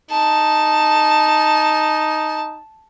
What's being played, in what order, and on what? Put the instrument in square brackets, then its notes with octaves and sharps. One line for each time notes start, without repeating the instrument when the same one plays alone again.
[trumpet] D#4 [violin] A5